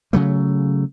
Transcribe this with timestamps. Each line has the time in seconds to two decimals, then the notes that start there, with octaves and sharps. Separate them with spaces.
0.13 C#3 F#3 A3